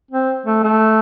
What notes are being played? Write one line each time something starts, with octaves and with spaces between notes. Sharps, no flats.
C4
A3
A3